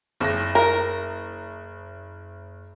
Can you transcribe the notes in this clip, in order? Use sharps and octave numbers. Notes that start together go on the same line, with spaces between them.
F#1 A#6
A#4